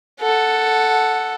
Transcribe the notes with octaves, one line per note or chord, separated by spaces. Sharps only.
A4 F#5